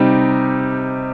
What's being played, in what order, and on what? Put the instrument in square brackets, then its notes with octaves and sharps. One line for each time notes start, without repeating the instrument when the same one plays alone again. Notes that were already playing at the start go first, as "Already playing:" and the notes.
Already playing: [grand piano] C3 G3 D#4 G4